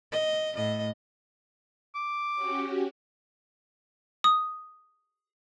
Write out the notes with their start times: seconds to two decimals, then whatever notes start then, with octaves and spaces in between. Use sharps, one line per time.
0.12 D#5
0.55 A2 D#5
1.95 D6
2.34 C#4 F#4 G4
4.24 D#6